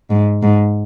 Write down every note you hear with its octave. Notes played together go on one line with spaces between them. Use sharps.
G#2
G#2